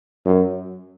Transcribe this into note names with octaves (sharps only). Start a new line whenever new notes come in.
F#2